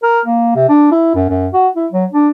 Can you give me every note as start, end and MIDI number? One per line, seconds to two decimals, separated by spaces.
0.03 0.20 70
0.26 0.55 58
0.56 0.67 48
0.69 0.87 62
0.91 1.14 64
1.15 1.27 42
1.29 1.49 42
1.53 1.69 66
1.76 1.87 64
1.92 2.05 54
2.13 2.29 62